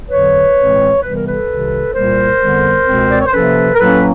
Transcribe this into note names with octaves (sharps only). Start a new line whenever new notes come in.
F2 D3 F#3 B4 C#5
A2 E3 G#3 C4
C3 E3 G3 B3 B4
A#4
A4 B4
C2 C3 D#3
C2 A#2 G3 A#3 A#4 C5
F2 D3 G3 B3
C#2 B2 G#3 C4
D5
C#5
C5
C3 F3 A#3 C#4 A4 B4
A#4
A2 F#3 A#3 C#4 A4 B4